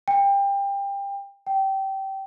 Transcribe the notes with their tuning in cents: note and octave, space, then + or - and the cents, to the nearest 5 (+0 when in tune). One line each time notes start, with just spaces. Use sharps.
G5 +25
G5 -20